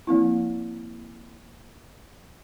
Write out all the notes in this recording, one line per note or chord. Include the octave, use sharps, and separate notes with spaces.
F3 A#3 C4 E4